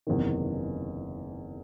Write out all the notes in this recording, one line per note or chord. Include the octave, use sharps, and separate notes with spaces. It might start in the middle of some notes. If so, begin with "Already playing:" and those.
F#1 E2 C3 D#3